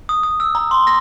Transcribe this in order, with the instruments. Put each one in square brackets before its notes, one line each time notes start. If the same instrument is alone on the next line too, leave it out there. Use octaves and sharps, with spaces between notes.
[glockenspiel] D#6
D#6
E6
A#5
C6
A#6